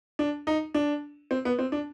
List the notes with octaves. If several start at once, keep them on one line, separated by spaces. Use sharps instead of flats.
D4
D#4
D4
C4
B3
C4
D4